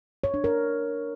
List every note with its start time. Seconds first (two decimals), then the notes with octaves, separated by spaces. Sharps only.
0.24 C#5
0.34 D4
0.44 A#4